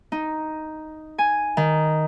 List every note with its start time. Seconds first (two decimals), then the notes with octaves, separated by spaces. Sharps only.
0.12 D#4
1.18 G#5
1.57 D#3